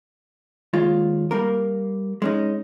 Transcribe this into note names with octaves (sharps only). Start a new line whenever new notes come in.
D#2 G#3 F4
G3 A#3 A#4
G#3 C#4 D#4